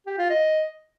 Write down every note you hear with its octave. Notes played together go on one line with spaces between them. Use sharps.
G4
F4
D#5